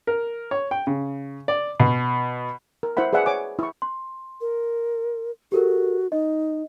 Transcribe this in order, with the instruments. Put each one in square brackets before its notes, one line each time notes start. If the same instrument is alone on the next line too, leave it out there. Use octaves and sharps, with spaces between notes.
[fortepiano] A#4
C#5
G5
C#3
D5
B2
[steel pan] A#4
E4 C5 E5 F#5 B5
G#4 B4 D5 E5 F#5
C#5 F#5 G#5 D6
E4 C#6
[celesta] C6
[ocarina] A#4
[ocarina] F#4 [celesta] G4 A4 A#4
[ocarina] D#4 [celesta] D#5